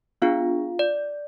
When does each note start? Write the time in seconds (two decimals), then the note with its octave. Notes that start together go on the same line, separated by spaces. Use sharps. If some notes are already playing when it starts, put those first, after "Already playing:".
0.22 B3 D4 F4 G#4 F5
0.79 D5